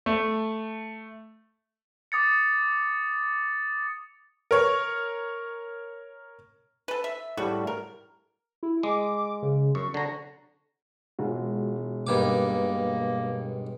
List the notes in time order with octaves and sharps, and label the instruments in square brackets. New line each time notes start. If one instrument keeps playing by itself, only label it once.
[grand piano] A3
[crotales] D6 D#6 A6 C#7
[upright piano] A#4 C#5
[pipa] A4 B4
E5
[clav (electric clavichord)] A2 G3 [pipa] F#4
[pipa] A#4
[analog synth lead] E4
[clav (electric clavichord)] G#3 [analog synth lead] D6
[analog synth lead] C#3
[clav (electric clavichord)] F#2 [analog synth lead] C#6
[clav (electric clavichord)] D3 A#5
[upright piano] E1 [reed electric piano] G#3 F4 F#4
[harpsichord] G2 D#3 D6 [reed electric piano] B2 G3 B4 [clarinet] A#3